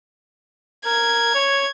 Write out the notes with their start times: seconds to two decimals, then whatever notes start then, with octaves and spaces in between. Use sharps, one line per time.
0.85 A#4 G#6
1.35 C#5